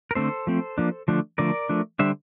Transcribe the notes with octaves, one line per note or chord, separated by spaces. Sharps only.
A#4
D3 A3 C4 A4 C5
F3 A3 C4
F3 A#3 D4
D3 F3 A3 D4
D3 F3 A3 A#4 D5
F3 A3 D4
D3 G3 D4 C5 E5